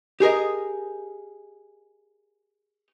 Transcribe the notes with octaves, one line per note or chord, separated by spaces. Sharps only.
G4 G#4 A#4 D#5